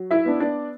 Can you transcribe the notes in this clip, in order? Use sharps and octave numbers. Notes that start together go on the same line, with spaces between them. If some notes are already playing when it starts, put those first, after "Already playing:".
Already playing: F#3
E4 E5
B3 D4
D4 D5